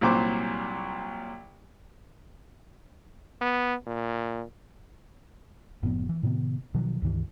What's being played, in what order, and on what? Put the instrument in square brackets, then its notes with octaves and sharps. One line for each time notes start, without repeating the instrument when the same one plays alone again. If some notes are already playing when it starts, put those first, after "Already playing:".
[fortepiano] C2 A#2 F#3 C5 D6
[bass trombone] B3
A#2
[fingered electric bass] F#1 A2 F3 B3
E3
A2 C3 D#3 B3
B2 D#3 F3 F#3
C#2 G2 D#3 E3